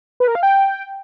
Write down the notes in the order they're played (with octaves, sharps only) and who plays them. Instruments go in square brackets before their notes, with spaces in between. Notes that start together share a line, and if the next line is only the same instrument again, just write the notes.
[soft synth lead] B4
A#4
F5
G5